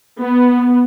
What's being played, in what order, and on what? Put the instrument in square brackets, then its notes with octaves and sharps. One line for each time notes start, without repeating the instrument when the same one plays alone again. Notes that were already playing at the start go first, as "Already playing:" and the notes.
[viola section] B3